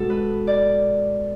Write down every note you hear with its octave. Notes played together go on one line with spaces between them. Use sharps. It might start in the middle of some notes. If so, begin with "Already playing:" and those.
Already playing: B2 G#3 F#4 A4
B4
D5